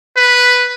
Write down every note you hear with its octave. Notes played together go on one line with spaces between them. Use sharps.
B4